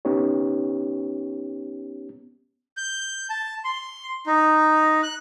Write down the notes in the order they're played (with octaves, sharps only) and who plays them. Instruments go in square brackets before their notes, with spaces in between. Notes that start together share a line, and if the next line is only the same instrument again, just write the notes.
[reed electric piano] B3 C#4 D#4 G4 C#5
[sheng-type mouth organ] G6
A5
C6
D#4
F#6